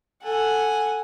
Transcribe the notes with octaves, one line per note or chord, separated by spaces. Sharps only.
A4 F#5 G#5